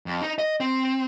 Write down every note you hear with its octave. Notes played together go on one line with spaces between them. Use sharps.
F2
D#4
D#5
C4